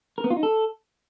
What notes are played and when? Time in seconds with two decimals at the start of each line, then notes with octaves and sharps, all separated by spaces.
0.18 A#4
0.24 B3
0.30 F4
0.37 D#4
0.43 A4